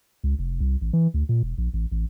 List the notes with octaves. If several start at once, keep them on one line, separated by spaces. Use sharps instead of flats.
C#2
F1
C2
A1
E3
D2
A#2
E1
A#1
A1
A1